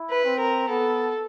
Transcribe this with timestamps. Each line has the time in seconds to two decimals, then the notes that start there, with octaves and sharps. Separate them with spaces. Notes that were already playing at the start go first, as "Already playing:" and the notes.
Already playing: E4
0.11 B4
0.25 C4
0.40 A#4
0.68 B3 A4